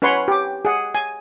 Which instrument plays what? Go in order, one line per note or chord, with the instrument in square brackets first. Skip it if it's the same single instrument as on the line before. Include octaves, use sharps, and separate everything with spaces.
[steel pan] C#4 B4 C#5 F#5 C6
G4 D6
G#4 F#5
G#5